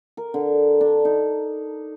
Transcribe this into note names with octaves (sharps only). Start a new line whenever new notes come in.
A#4
D3
D4
D#4